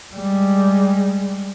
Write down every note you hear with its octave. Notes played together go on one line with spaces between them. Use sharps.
G3 G#3